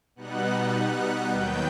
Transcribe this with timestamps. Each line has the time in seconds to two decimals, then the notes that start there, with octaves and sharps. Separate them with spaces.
0.16 B2 G3 B3 D#4 F#5 F#6
1.30 D#2 D#3 F#3 B3 G5 G6